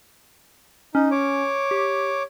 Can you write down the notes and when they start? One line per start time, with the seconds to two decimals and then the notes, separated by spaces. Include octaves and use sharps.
0.95 C#4 D#4
1.11 C#5 D6
1.71 G4